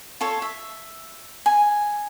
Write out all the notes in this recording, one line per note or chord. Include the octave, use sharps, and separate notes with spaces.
F4 A4 C#5
E5
G#5